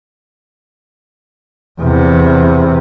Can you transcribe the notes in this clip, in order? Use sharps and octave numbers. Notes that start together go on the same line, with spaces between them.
E2 C3